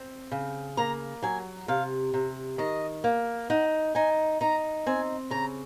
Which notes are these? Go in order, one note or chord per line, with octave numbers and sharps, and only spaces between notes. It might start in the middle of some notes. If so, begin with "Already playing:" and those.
Already playing: C4
C#3
A#3 A#5
F#3 G#5
C3 F5
C3
D#3 D#5
A#3
D#4 F#5
D#4 G#5
D#4 A#5
C4 G#5
C#3 A#5